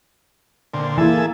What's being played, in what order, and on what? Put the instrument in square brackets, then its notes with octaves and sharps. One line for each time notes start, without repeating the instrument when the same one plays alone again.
[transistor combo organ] A#2 D3 C4
[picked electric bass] E3 [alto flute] A#3 [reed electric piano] E4 G#5 [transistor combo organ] G#4 A4 E5